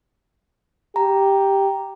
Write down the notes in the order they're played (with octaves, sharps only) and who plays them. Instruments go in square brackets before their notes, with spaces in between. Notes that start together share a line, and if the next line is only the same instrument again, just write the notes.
[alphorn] G4 [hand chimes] A#5